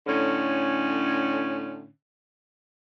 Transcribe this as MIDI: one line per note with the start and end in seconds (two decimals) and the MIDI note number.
0.07 1.87 45
0.07 1.87 50
0.07 1.87 61